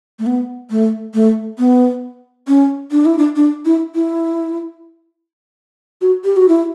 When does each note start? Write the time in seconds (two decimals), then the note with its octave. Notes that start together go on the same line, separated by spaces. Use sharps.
0.19 A3
0.26 B3
0.71 A3
1.14 A3
1.59 B3
2.48 C#4
2.92 D4
3.05 E4
3.18 D4
3.36 D4
3.65 E4
3.95 E4
6.01 F#4
6.24 G4
6.37 F#4
6.48 E4